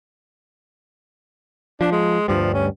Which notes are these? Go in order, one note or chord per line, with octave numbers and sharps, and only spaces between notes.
F3 D4
G#3
D2 G2 F3 G3
C#4